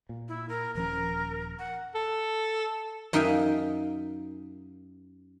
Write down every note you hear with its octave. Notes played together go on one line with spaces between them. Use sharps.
A#2
E4
A#4
D#1 F3 C#4 A#4
F#5
A4
F#2 D#4 E5 F5 G5 G#5